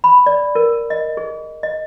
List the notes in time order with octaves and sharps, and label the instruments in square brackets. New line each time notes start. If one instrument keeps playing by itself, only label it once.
[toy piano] B5
D5
A#4
D#5
G#4
D#5